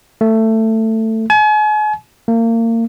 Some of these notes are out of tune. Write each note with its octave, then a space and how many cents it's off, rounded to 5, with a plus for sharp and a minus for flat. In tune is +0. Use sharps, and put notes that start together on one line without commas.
A3 +15
G#5 +40
A#3 -30